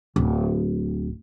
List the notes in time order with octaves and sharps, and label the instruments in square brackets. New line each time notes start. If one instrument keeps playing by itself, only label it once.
[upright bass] D1